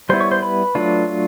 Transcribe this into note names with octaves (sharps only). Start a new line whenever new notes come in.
G3 B3 E4 C5 C6
C#5 C#6
C5 C6
B4 B5
F#3 A3 D4 F4